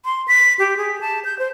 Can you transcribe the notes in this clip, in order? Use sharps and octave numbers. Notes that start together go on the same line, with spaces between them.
C6
B6
G4
G#4
A5
G6
C5